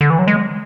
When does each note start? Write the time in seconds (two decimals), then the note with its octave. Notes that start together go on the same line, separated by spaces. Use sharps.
0.01 D3
0.10 E3
0.19 F#3
0.28 G#3